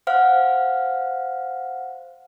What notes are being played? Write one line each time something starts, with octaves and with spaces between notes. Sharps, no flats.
C5 F5 F#5 F6